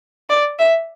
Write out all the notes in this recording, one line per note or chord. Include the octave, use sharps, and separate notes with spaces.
D5
E5